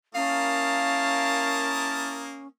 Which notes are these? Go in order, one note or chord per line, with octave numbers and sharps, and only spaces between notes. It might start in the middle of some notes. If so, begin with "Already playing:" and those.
A#3 C#4 E4 A#4 F5 A5 D#6